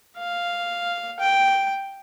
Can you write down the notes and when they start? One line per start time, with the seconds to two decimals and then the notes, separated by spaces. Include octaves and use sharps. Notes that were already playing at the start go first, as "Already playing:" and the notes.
0.18 F5
1.20 G5